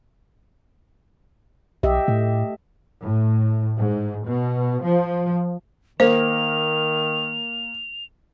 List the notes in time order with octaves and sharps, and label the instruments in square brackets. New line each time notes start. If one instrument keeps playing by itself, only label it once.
[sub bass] B1 [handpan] G4 D#5 E5
[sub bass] A2 [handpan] A3
[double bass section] A2
G#2
B2
F3
[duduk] D#3 [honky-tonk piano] A#3 [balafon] C5 [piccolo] F7